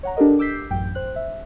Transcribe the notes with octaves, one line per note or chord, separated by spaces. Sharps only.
C#5 F#5 A#5
D4 G4 A4 A#4 D#5
D6 E6 G6 B6 C7
A1 F#2 G5 G6
C5 F#6
E5